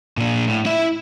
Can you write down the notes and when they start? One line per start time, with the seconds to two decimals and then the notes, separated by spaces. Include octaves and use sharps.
0.17 A#2 D4
0.46 A2
0.66 E4 E5